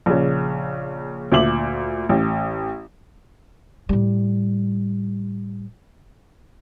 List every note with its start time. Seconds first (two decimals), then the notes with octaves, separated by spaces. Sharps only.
0.06 A#1 C#3
1.32 D2 A#2 E5 D6 F#7
2.09 A1
3.89 A2 G3